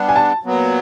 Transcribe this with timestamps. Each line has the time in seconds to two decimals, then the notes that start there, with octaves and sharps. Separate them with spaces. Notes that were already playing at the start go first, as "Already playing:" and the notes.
Already playing: G3 B3 D4
0.09 G#5
0.16 A5
0.44 A#2 F#3 B3